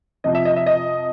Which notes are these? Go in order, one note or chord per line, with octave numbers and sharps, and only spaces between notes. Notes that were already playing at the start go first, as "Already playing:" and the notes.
F2 C3 F3 D#5
E5
D#5
E5
D#5